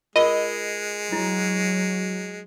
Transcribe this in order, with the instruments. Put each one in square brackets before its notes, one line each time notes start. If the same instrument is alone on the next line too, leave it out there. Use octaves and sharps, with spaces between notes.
[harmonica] G#3 [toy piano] F4 A#4 [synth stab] D#5
[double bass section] F#3 [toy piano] E4